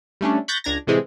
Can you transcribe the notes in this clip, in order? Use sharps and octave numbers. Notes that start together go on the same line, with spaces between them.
G3 A3 C#4 D4
B5 C#6 F#6 G6 A6 A#6
C#2 D4 A#5 G#6 A#6
A2 C3 E3 G#3 C4 E4